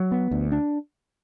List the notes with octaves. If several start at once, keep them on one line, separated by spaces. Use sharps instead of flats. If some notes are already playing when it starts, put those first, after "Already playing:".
Already playing: F#3
B3
D2
D4